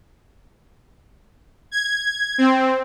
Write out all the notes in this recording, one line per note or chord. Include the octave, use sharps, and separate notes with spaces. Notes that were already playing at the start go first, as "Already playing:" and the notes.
G#6
C4